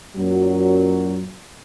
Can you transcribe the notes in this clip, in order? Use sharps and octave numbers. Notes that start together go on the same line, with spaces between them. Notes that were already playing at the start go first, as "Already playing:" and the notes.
F#2 A#2 F#3